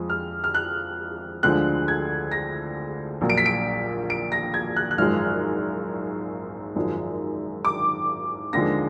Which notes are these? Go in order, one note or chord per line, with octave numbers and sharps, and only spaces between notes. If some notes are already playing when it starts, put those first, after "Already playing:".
Already playing: F2 F3 G#3
F6
F6
F#6
D2 D3 F3 G#3 F#6
G#6
A#6
A#1 A#2 F#3
D7
B6
D7
D7
A#6
G#6
F#6
F#6
G#1 F#2 F3 G#3 F6
G#1 F#2 F3 G#3
D6
D#2 D3 F3 G#3 A#6